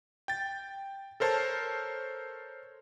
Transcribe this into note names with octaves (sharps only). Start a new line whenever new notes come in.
G5 A6
A4 A#4 C5 C#5 A5